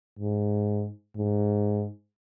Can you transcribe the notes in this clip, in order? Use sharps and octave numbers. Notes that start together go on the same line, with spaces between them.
G#2
G#2